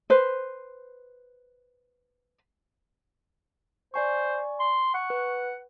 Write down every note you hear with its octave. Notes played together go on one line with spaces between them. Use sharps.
B4 C5
C5 D5 G#5 C#6
C6
F#5 C#6
B4